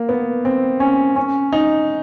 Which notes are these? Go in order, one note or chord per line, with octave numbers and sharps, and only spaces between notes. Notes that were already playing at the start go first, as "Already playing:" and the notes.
Already playing: A#3
B3
C4
C#4
C#4
D#4